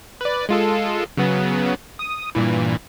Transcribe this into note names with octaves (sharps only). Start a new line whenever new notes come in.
B4 D5
G#3 F4 A4
C#3 F#3 B3
D#6
G2 A#2 E3